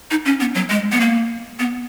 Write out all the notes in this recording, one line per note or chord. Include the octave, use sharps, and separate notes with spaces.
D#4
C#4
B3
F#3
G#3
B3
A#3
B3